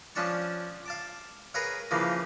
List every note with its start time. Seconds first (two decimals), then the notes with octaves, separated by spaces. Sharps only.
0.15 F3 C#4 D4 A5 C#6
0.86 F5 A5 D6
1.54 G#4 A#4 B4 C#5 F5
1.91 C#3 E3 F3 A#3